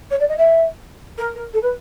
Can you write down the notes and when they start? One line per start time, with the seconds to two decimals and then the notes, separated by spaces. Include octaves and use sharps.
0.11 C#5
0.20 D5
0.29 D#5
0.38 E5
1.18 A#4
1.35 A#4
1.53 A4
1.62 B4